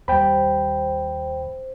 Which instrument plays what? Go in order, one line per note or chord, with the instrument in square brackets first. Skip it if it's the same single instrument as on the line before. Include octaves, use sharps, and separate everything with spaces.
[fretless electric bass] D#2 G3 [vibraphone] C5 [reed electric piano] G5 B5